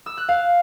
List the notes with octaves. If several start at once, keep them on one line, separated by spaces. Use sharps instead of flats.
E6
F#6
F5